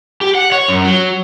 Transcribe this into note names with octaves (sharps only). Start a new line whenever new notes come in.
G4
F#5
C#5
F#2
F#3